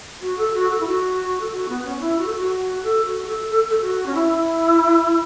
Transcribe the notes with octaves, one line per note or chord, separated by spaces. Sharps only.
F#4
A4
F#4
A4
E4
F#4
A4
F#4
B3
C#4
C#4
E4
F#4
A4
F#4
A4
F#4
A4
A4
A4
F#4
C#4
E4